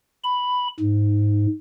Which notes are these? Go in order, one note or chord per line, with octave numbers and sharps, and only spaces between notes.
B5
G#2